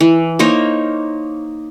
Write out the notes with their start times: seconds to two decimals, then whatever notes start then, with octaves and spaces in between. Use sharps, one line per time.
0.01 E3
0.39 A#3 D#4 C5 C#5